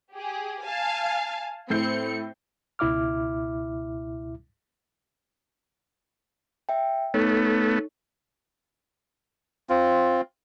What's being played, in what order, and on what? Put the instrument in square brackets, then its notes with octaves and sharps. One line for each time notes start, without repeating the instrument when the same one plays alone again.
[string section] G4 G#4
F5 G#5 A5
[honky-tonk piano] A2 G6 C7 [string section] C4 C#7
[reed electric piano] C#2 B2 E4 E5 D6 F6
[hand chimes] E5 G5
[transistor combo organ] A3 B3 [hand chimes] D#4 A4 C#5
[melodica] C4 F4